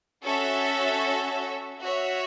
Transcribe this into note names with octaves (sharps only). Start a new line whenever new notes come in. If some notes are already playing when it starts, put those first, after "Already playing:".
C#4 F#4 A4 C#5 E5
F#4 C#5 E5